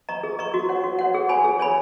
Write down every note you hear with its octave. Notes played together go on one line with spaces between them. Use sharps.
D#5 A#5 C#6
G#4
D#5 A#5 C#6
F#4
C#5 F#5
F#4
C#5 F#5
G#4
C#5 G#5 B5
G#4
C#5 G#5 B5